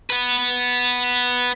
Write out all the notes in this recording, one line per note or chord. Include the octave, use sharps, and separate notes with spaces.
B3 B4